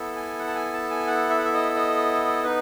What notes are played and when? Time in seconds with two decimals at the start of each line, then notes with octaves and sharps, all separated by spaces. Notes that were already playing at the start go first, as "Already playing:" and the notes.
Already playing: B3 E4 A4
0.16 G#5
0.39 F#5
0.47 A5
0.55 G#5
0.74 A5
0.91 G#5
1.07 F#5
1.30 E5
1.38 F#5
1.45 E5
1.53 D#5
1.75 D#5
2.44 B3 D#4 B4